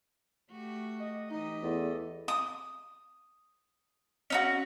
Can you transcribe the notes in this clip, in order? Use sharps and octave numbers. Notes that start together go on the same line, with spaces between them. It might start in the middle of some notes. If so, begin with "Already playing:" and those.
A3 F#4 G4
D#5
E3 D#4 G4 D#5
E2 A4
D#6
C#4 D#4 F#4